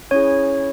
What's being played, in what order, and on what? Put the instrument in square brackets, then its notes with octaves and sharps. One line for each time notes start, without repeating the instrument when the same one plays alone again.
[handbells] C#4 E4 G#4 C#5